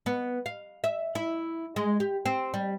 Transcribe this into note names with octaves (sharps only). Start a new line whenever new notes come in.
B3
F5
E5
E4
G#3
G4
C4
G3